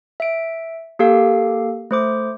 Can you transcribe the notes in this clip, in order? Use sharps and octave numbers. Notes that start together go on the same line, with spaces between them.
E5 D7
A#3 G4 A4 F5
A3 C5 D6